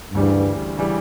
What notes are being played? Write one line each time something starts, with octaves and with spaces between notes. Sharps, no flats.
D2 G2 C#3 E3 G3
C#3 E3 G3